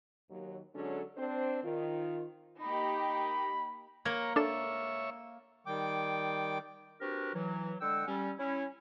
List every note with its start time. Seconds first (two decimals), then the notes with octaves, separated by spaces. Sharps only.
0.30 D#2 F#3
0.74 D3 F#3 G#3 C#4 D4 A4
1.18 C4 D4 C5
1.64 D#3 F4
2.62 A#3 D#4 G4 B5
4.05 A#3 C#5 A#5 G#6
4.36 D4 A4 C#5 E5 E7
5.66 D#3 G3 G5 D6
7.01 C4 D4 F#4 G4 A#4 B4
7.34 E3 F#3
7.80 D3 G#3 F#5 G5 E6
8.07 G3 C#4
8.38 C#4 E4